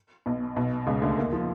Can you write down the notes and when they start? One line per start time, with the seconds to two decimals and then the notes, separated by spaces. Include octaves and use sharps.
0.26 B1 B2
0.56 B1 B2
0.86 C#2 C#3
1.02 D2 D3
1.17 D#2 D#3
1.33 F3